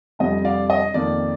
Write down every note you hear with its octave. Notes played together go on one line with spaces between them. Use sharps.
F2 C3 G3 D4 D#5
D5 F5
D#5
F2 D#3 A#3 D#4 D5